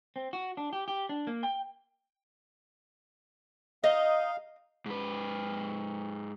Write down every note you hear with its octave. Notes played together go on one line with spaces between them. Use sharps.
C4
F#4
D4
G4
G4
D4
A#3
G5
D#4 D#5 F5
G#2 B4